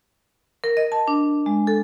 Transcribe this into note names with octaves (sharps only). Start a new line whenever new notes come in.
A#4
D#5
A5
D4
G#3
A4